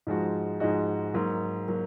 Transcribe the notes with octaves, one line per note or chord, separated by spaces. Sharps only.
G#2 F3 G#3 D#4 F#4
G#2 F3 G#3 D#4 F#4
G#2 F#3 A#3
F#3 A#3